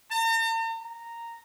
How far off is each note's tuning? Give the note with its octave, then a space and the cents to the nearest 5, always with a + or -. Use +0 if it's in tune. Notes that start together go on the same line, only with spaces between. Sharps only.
A#5 -45
A#5 -10